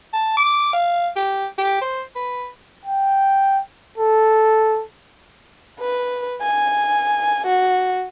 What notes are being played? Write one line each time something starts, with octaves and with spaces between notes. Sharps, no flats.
A5
D6
F5
G4
G4
C5
B4
G5
A4
B4
G#5
F#4